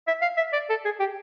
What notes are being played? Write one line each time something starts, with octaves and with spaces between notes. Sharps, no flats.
E5
F5
E5
D5
A4
G#4
G4